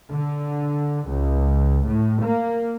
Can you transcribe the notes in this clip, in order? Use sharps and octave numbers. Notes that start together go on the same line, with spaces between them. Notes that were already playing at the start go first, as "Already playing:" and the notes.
D3
C#2
A2
A#3